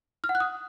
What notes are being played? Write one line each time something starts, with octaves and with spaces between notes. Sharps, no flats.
F6
F#5
F#6
D#6